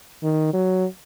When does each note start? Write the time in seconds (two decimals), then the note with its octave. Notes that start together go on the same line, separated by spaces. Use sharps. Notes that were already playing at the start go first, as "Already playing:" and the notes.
0.23 D#3
0.53 F#3